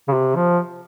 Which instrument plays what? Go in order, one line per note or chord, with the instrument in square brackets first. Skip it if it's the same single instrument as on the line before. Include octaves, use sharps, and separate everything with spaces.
[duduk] C#3
C3
F3